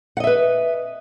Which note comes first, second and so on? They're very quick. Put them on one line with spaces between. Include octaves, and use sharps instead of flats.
F#5 D#5 E5 B4